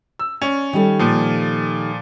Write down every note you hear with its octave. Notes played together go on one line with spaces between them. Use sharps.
E6
C#4 D5
D#3 G3 A4
A#2 F3